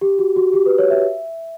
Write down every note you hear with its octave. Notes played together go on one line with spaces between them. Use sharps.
G4
F#4
F#4
G4
B4
C#5
E5